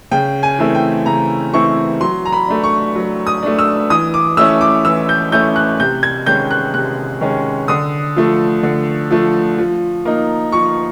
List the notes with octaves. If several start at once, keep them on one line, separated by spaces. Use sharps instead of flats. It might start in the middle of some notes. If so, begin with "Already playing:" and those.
C#3 G5
G#5
E3 A3 C4 E4
G5
C#3 A#5
E3 A3 C4 E4 C#6
F#3 C6
A#5
B5
A3 D4
C#6
F#3
D#6
A3 D4
E6
E3 D#6
D6
A3 C#4 E4 E6
D6
E3 E6
G6
A3 C#4 E4 G6
F#6
C3 G6
G#6
D#3 G#3 C#4 G6
F#6
C3 F#6
D#3 G#3 C#4
D3 D#6
F3 A3
D3
F3 A3
F3
A#3 D#4
F3 C#6